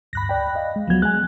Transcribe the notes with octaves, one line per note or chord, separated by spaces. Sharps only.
D2 G2 B5 F#6 A#6
C#2 D5 G5
D#5 F5
G#3
C#2 F3 F#3 B3 G#6
G#3 G#5 F#6